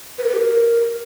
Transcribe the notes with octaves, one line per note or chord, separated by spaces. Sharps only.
B4
A#4
B4
G4
A#4